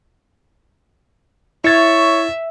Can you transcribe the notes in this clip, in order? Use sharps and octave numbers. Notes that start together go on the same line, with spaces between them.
E4 C#5 E5 A6